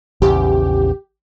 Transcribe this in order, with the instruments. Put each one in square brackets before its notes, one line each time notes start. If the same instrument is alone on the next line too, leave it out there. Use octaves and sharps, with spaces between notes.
[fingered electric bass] A#1 E2 C#3 [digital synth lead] G4